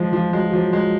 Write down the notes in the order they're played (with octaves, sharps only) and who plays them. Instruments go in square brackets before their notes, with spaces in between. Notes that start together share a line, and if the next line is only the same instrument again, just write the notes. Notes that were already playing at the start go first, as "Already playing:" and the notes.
Already playing: [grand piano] F3 G#3
F3
[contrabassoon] F#3 [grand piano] G#3
[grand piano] F3 [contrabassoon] F#3
[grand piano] G#3